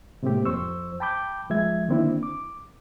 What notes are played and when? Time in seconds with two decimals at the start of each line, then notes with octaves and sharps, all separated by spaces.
0.23 A2 C3 G#3 A#3 C4 G4
0.45 F2 C5 C#6 E6
1.00 G5 A5 B5 D6 G6
1.49 C#2 F3 G#3 E5 G#6
1.88 D3 D#3 A#3 C4 D4 E4
2.23 D6